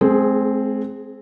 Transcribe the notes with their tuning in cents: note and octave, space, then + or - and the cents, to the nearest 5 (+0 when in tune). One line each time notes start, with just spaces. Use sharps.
G#3 +40 C4 +0 G#4 +0